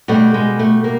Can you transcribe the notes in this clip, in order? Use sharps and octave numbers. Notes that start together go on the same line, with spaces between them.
B2 G3 A3
G#3
A3
A#3